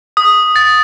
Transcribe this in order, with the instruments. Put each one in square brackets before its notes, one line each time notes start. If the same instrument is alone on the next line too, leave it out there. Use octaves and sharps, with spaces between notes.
[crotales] D#6
A6